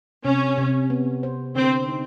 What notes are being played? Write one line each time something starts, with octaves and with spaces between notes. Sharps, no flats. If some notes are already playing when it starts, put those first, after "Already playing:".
C3 C#4
C3
B3
C5
D3 C4
D#4